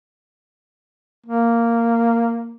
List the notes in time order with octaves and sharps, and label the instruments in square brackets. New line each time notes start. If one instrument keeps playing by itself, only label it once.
[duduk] A#3